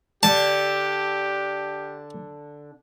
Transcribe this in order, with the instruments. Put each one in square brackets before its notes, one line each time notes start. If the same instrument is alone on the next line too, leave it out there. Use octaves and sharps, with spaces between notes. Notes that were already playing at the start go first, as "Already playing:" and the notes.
[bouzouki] D3 D4 [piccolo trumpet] G4 [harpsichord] A5